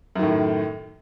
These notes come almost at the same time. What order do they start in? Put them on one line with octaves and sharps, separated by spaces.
F#2 D#3 A2